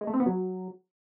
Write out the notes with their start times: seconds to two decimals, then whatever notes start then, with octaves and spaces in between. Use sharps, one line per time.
0.01 G#3
0.07 A3
0.14 C4
0.20 B3
0.26 F#3